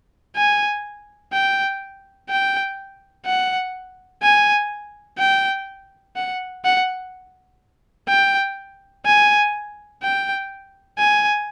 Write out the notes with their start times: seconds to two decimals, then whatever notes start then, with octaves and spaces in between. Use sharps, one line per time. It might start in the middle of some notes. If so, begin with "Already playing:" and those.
0.36 G#5
1.33 G5
2.30 G5
3.26 F#5
4.23 G#5
5.19 G5
6.16 F#5
6.65 F#5
8.08 G5
9.06 G#5
10.03 G5
10.98 G#5